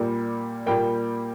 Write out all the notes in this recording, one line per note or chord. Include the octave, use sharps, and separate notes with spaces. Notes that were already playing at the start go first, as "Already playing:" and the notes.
Already playing: A#2 G3 A#3
A#2 G3 A#3 G5